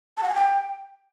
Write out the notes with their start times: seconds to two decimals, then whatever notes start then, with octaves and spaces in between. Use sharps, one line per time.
0.17 A5
0.23 F#5
0.29 G#5
0.34 G5